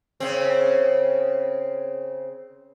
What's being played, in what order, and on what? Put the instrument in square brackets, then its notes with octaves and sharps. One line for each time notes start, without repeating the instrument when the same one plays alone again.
[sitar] C#3 C4